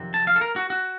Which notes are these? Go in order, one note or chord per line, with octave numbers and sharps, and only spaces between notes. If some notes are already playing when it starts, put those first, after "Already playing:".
Already playing: F2 C3 D#3 F#3 C4
A5
F5
A4
A#4
F#4
F#4